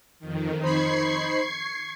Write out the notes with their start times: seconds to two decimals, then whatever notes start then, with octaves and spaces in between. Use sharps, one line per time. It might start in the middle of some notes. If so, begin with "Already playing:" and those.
0.19 F2 D#3
0.60 D#4 C5 B5 C#6 G#6 C7